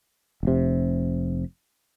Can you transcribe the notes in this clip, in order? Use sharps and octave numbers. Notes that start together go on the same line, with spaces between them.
F1 C3